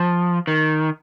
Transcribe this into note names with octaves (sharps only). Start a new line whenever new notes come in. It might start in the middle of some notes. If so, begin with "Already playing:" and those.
Already playing: F3
D#3